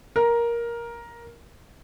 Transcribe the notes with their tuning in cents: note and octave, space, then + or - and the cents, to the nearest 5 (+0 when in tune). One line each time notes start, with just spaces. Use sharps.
A#4 +10